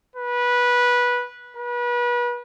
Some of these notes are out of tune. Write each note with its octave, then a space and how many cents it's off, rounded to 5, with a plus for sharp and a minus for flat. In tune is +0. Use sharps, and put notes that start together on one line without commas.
B4 -15
B4 -35